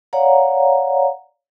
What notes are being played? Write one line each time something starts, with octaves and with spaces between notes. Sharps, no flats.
C#5 D5 F5 F#5 A#5